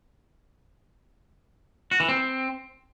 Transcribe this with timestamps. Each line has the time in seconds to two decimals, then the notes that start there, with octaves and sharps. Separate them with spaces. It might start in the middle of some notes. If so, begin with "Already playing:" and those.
1.91 F#4
2.00 E3
2.09 C4